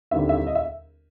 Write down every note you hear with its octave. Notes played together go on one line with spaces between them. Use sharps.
D#2 D3 G3 C4 E4 E5
E5
D#5
E5